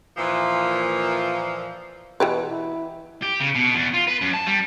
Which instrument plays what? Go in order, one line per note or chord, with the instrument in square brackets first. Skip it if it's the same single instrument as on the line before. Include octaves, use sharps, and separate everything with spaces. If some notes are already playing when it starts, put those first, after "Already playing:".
[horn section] A#2 E3 F3
[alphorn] B2 [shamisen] E3 G4 B4
[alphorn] E4
[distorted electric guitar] G4
C#3
B2
E2
F4
B4
F#2
A5
G3